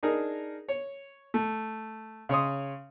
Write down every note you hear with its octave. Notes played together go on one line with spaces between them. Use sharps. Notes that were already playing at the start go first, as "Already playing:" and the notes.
D4 D#4 G#4 A#4
C#5
A3
C#3 C#5 C6 D#6